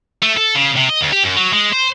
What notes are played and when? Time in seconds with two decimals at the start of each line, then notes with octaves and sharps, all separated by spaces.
0.22 A3
0.37 A4
0.55 C#3
0.77 C3
0.89 D#5
1.01 D2
1.12 G4
1.23 F#2
1.36 F#3
1.53 G#3
1.73 C5